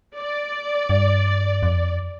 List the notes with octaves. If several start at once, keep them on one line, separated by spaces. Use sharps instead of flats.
D5
G2
F2